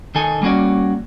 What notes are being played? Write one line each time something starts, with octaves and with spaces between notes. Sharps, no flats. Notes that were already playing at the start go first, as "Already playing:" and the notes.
D#3 D#4 A4 G#5
G3 A#3 C#4 F#4 D5